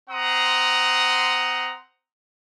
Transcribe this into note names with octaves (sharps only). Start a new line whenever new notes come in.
C4 F#5 A#5 C6 D#6